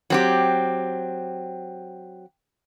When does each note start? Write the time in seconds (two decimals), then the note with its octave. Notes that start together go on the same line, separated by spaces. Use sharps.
0.10 F#3 C4 G4